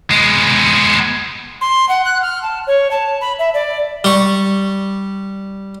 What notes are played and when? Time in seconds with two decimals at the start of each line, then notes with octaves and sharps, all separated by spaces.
0.11 G#3 B3
1.61 C6
1.89 F#5
2.05 F#6
2.22 F6
2.42 A5
2.67 C#5
2.91 A5
3.21 B5
3.39 E5
3.54 D5
4.04 G3 C#6